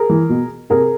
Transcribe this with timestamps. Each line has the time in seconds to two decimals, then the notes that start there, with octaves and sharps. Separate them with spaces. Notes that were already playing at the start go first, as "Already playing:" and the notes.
Already playing: G#4 A#4
0.09 E3
0.29 B2
0.70 C3 G#4 A#4